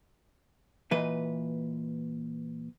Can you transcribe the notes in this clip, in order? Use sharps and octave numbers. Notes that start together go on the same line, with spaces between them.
A#2 E3 B4 D#5